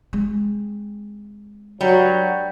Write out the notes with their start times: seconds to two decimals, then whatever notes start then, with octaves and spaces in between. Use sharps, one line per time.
0.13 G#3 C4
1.81 G2 F#3 G3